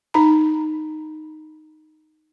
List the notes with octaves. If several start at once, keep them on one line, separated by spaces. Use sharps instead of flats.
D#4 A#5